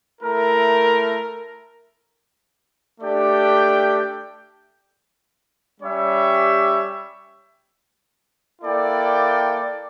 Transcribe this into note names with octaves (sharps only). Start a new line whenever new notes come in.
A3 E4 A#4
A3 D4 G4 D5 G5
G3 C#4 G4 C#5 E5
A#3 E4 A4 D5 G5